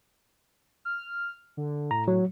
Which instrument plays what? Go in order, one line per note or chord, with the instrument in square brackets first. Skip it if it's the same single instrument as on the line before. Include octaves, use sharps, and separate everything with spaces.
[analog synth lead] F6
D3
[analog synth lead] A2 [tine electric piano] A#5
[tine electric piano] F#3